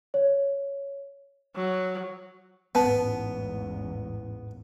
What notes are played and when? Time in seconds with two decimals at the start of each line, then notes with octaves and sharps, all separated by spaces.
0.14 C#5
1.56 F#3
2.75 A1 E2 G#2 B3 B4 A5